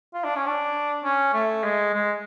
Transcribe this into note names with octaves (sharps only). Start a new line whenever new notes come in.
F4
D4
C#4
D4
C#4
A3
G#3
G#3